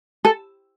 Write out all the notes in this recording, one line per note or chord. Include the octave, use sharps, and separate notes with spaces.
A4